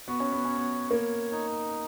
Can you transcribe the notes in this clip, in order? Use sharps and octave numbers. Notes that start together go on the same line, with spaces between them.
B3 F#4
C#4
B3
C#4 C#5
B3
A#3 C#5
D#4